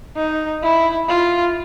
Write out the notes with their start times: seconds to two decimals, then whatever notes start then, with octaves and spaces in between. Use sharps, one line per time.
0.16 D#4
0.62 E4
1.08 F4